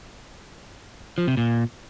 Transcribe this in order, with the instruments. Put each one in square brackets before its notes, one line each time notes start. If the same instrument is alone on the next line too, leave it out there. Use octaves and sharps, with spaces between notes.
[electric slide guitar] F3
C3
A#2